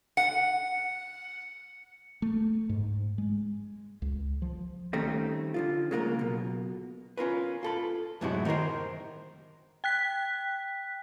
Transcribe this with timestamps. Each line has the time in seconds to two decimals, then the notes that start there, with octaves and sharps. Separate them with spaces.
0.17 F#5 C#7
2.22 A3
2.69 G#2
3.18 G#3
4.02 C#2
4.42 F3
4.93 D#3 G3 A3 C4 C#4 D#4
5.54 D3 F3 F4
5.91 C#3 G#3 A#3 F4 F#4 A#4
6.19 B1 B2
7.17 C#4 F4 A#4 B4
7.63 F4 A4 B5
8.21 F#2 A2 C3 G#3 E4 F#4
8.45 D#3 D#4 G4 A#4 C5
9.84 G5 F#6 B6